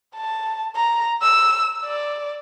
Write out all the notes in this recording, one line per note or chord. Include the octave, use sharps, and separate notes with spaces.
A5
A#5
E6
D5